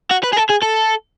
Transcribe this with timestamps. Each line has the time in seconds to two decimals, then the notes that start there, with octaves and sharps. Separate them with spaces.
0.11 F#4
0.24 B4
0.33 G#4
0.37 A4
0.50 G#4
0.63 A4